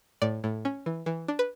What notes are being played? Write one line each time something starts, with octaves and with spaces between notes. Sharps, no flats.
A2 D5
A2
C#4
E3
E3
D4
B4